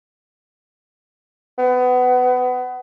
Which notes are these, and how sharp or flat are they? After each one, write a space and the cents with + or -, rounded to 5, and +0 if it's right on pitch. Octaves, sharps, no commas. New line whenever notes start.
B3 +25